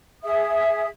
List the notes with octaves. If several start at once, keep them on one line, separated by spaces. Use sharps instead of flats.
G#4 E5 D#6